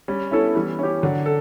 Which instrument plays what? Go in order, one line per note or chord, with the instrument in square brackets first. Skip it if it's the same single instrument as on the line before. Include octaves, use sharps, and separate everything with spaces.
[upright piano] G3 [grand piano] C#4
[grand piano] B3 [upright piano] C#4 E4 A4
[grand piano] E3 [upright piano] G3
[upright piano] C#4 G4
[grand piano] D3 [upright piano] F#3
[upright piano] A4